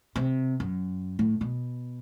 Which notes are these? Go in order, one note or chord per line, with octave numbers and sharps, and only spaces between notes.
C3
F#2
A2
B2